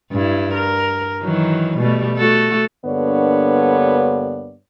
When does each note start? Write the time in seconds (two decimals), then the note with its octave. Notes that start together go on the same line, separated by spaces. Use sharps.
0.12 G2 E4
0.54 A#4
1.22 D#3 E3 F#3
1.78 B2 G3 A3
2.18 A3 F#4 A4
2.85 G2 D3 A#3 B3 C#5 D5